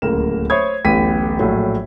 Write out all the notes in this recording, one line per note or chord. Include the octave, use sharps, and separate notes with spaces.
D1 C#2 A#3 A#4 E7
C5 C#5 E5 B5 D#6 G#6
D1 A1 B3 G4 B6 D#7
A#1 A2 F#3